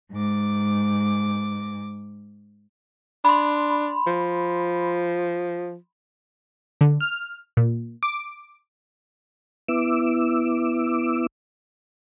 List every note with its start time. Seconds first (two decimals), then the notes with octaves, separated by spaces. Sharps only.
0.13 G#2 D6
3.25 D4 B5 C6
4.07 F3
6.81 D3
7.01 F6
7.57 A#2
8.03 D6
9.69 B3 E4 D6 E6